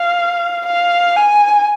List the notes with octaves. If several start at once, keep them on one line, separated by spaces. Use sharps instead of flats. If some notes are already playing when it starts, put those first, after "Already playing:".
Already playing: F5
F5
G#5